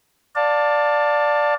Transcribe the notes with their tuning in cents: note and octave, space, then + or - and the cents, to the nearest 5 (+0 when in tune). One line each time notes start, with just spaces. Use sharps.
D5 +0 F5 +25 A5 +15